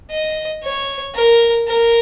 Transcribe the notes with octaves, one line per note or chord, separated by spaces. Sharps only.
D#5
C#5
A#4
A#4